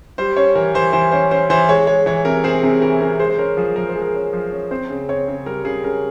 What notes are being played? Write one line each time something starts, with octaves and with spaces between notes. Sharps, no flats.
G3 C5
C#4 C#5
E3 A#4
E3 C5
E3 C5
C#4 C5
C#4 C5
E3 C5
G#3 C#5
G#3 C#5
E3 C#5
C3 A#4
C4 G#4
C3 G#4
E3 A#4
C3 A#4
G#3 C5
C5
C#4 A#4
F3 G#4
F3 A#4
C5
G#3
A#4
C#4
F3
C#4
C4 C5
C#3
C4 C#5
C#3
G3 A#4
C#3 G#4
C#3 A#4